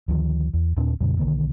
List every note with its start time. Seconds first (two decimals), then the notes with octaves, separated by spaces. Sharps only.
0.08 D2 D#3 F3
0.53 E2
0.77 D#2 A#2 C4 D4
1.01 F2 A#2 C#3 G3
1.19 B1 D3 D#3 A#3